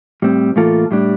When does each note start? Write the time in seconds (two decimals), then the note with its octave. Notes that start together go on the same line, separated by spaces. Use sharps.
0.22 A2 G3 C4
0.56 A2 E3 A#3 F4 A4
0.91 A2 G3 D4